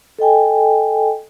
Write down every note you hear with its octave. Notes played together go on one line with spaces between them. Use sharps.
A4 D#5 G5 G#5